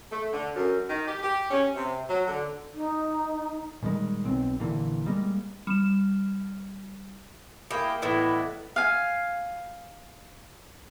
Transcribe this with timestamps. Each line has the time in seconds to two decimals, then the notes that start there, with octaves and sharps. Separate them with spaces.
0.12 A3
0.33 D3
0.56 F#2
0.88 D#3
1.07 G4
1.23 G4
1.51 C#4
1.75 C3
2.08 F#3
2.27 D3
2.74 D#4
3.82 A#2 D#3 G3 G#3
4.25 B1 C4
4.60 A#1 A#2 D3 E3
5.06 G3 G#3 A#3
5.67 G3 E7
7.71 A#3 E4 G4 G#4
8.02 A2 E3 B3 E4 B4 D5 D#5
8.76 F5 G#5